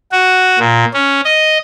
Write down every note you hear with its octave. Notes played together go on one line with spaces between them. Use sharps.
F#4
A#2
C#4
D#5